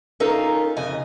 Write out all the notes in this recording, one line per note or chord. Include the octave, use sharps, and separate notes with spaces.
C#4 D#4 F4 A4 A#4
F2 C#3 D#5 G#5